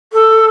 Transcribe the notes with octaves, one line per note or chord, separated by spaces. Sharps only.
A4